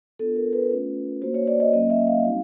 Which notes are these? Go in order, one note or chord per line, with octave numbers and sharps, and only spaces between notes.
B3 D4 F4 A4
A#4
B4
A3 C#4 F4
A#3 D4 F#4 C5
C#5
D5
D#5
F#3 A#3 C#4 D#5
E5
F5
G3 C4 D#4 F#4